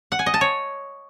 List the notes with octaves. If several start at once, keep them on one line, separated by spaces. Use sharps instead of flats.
F#5
G#5
D#5
A5
C#5